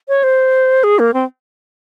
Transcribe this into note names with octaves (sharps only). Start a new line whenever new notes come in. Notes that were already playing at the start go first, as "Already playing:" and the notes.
C#5
C5
G#4
A#3
C4